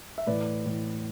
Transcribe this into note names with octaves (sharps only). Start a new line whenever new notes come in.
E5
A2 E3 B4 D5
A2 E3